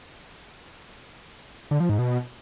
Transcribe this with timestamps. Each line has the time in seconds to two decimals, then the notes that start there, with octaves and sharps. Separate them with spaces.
1.71 D3
1.80 F3
1.89 G#2
1.99 B2